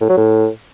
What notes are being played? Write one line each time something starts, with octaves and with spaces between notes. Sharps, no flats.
A2
F#3
A2